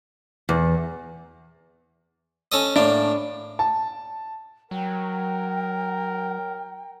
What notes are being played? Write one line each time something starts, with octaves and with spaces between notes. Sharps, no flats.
E2
C#4 A4 D#5
A2 A#3 D4
A5
F#3 A#4 G5